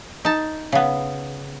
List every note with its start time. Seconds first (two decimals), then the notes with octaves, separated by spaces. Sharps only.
0.25 D#4 A5
0.72 C#3 B3